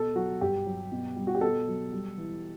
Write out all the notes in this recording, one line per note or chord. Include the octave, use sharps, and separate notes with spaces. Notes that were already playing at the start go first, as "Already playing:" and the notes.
Already playing: B2 A4
F#3 F#4
G2 G4
F#3
B2
G3
F#4
G4
B2 A4
F#3
G3
E3